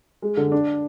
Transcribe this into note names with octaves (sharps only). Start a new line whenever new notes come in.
G#3
D3
D4